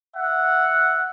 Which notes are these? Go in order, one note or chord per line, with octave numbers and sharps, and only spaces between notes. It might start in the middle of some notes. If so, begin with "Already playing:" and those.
E5 F#5